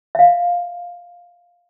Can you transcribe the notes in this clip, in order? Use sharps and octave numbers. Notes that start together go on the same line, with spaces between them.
E5 F5